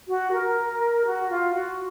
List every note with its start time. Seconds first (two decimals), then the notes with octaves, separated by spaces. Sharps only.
0.08 F#4
0.32 A#4
1.05 F#4
1.29 F4
1.54 F#4